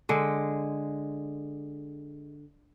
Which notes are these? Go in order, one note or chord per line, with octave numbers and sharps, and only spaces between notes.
D3 G#3